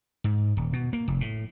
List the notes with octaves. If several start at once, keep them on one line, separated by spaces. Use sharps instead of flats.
G#2
D#1
B2
A#3
F1
A2